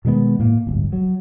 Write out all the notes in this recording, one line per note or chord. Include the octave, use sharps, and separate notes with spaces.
B2 D#3 G#3 B3
A2 A#3
D1 G1
F#3